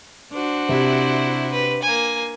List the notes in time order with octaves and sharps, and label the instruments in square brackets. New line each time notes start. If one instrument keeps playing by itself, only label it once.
[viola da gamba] D4 F#4 C5
[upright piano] C3 [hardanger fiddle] E4
[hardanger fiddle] B4
A#3 G#5